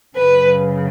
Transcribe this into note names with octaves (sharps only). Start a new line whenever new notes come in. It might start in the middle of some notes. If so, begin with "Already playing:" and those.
F#2 C#3 F#3 B4